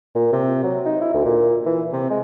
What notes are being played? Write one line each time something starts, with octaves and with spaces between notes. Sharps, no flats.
A#2
C3
F#3
D#4
E4
D2
A#2
E3
C3
G#3